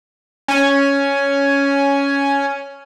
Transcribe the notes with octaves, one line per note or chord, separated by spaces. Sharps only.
C#4 G#5